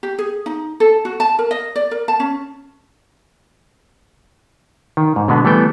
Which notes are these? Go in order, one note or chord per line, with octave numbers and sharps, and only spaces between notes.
G4
G#4
D#4
A4
F#4
A5
A#4
D#5
D5
A#4
A5
C#4
D#3
G#2
B2 D3 G#3 B3
E3 G3 A3 B3 A4 G5